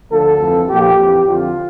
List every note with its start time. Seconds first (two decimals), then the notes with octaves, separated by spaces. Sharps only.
0.11 D2 D3 F3 A4
0.40 F2 E3
0.69 A#1 A#2 F3 G4
0.98 F2 E3
1.27 F2 D3 F3 F4